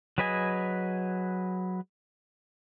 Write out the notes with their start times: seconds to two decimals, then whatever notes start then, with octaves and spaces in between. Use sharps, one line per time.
0.18 F#3 G#4 B4 D#5 G#5